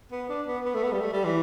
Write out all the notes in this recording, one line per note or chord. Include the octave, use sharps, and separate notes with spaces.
B3
D4
B3
B3
A3
B3
G3
A3
G3
E3